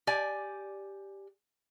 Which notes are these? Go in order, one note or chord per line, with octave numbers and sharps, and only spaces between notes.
G4 D5 G#5